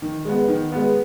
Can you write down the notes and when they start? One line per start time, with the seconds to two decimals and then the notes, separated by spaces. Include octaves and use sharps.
0.02 D#3
0.25 G#3 B3
0.48 D#3
0.72 G#3 B3